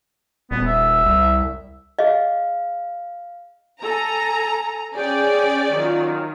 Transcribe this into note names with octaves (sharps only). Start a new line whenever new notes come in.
D#1 B3
E5
C2
G#4 D#5 F5
A4 G#5 A#5
C#4 G#4 D5 G5
D#3 F#3 F4